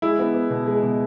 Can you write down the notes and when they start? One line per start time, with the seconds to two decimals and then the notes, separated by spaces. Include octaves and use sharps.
0.02 G#3 E4
0.19 B3
0.34 B3
0.50 B2
0.67 G#3
0.83 B2